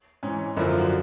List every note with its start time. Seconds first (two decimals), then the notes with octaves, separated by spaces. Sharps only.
0.23 G#2 E3 C#4
0.57 F#2 D3 F3 E4
0.68 F4
0.79 F#4